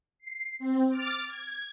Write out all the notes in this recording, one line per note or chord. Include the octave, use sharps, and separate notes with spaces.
C7
C4
D6 F6 A6
G#6